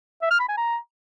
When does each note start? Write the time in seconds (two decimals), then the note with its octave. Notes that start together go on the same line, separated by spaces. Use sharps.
0.22 E5
0.31 F6
0.40 B5
0.49 G#5
0.58 A#5